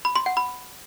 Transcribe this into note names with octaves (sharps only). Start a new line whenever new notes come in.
B5
C6
F#5
B5